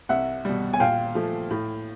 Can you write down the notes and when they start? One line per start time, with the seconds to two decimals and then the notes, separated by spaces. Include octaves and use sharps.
0.09 C2 E5 F#5
0.45 B2 G3
0.73 G#5
0.80 A#2 F5 G5
1.15 F3 A3
1.51 A2